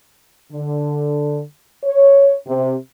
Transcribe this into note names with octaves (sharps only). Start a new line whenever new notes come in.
D3
C#5
C3